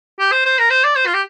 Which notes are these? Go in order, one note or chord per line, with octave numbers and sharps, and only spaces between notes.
G4
C5
C5
A#4
C5
D5
C5
F4
G4